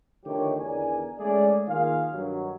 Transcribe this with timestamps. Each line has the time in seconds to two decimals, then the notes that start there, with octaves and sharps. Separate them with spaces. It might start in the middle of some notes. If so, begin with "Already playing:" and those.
0.25 D3 D#3 F3 A3 G4 C#5
0.59 E2 D3 D#3 A#4 D5 G#5
1.18 G#3 A3 C#4 E4 G#4 D5
1.68 D#3 A#3 F4 G#4 F5
2.11 G2 D#3 F#3